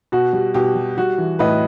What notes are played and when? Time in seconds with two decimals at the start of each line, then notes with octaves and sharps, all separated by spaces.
0.12 B2 F#4
0.33 G3
0.54 B2 G4
0.75 G3
0.98 G3 F#4
1.18 E3
1.39 A2 B4 D#5